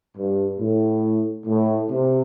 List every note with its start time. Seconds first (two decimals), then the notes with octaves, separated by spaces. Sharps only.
0.17 G2
0.59 A2
1.46 A2
1.89 C3